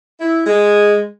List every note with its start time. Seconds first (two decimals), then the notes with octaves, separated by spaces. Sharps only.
0.20 E4
0.47 G#3